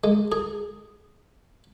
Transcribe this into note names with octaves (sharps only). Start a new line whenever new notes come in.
G#3
G#4